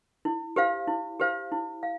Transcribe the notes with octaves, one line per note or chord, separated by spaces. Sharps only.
E4
G4 C5 F5
E4
G4 C5 F5
E4
F5